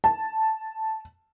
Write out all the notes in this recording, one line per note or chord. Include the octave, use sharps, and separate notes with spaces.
A5